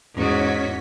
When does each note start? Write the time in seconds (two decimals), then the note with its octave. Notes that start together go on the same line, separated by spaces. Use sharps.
0.15 E2 G#2 C#4 F#4 C#5 B6